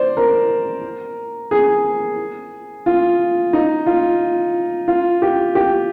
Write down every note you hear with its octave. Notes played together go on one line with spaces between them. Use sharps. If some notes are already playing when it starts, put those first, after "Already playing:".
Already playing: C5 D5
A#4
G#4
F4
D#4
F4
F4
G4
G4